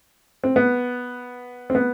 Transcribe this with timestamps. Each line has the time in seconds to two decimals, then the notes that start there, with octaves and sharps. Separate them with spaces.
0.44 C4
0.56 B3
1.70 C4
1.75 B3